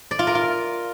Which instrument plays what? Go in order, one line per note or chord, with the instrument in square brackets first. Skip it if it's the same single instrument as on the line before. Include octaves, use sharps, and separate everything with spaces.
[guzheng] D5
F4
A#4
F4